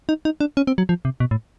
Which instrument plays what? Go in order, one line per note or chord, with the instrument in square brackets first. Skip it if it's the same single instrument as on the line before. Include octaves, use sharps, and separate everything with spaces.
[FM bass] D#4
D#4
D4
C#4
C4
F#3
F3
C3
B2
A2